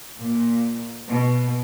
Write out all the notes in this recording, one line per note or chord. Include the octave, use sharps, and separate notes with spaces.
A#2
B2